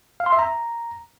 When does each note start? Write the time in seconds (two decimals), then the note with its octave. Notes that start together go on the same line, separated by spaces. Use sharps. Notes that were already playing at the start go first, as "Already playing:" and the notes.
0.20 F5
0.26 C6
0.32 E5
0.39 A#5